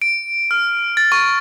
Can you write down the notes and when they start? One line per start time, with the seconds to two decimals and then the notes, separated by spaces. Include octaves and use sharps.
0.02 D7
0.51 F6
0.97 A6
1.12 C#6